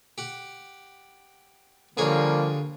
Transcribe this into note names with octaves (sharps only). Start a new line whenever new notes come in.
G4 F#5
D3 F3 G3 A#3 G#4 C#5